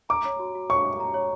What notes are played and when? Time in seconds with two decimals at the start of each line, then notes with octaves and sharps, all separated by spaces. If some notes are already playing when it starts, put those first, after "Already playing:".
0.09 A#5 D6
0.25 C#5
0.39 F#4
0.55 F#4
0.70 C#5 C#6
0.85 C#5
1.00 A#5
1.14 C#5